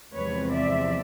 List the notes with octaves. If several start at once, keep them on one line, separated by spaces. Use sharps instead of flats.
E2 C3 F3 G#3 C4 B4 C#5
D5 E5